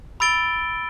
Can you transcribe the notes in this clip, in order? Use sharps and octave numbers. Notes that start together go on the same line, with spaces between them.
B5 E6 A6 D7 G7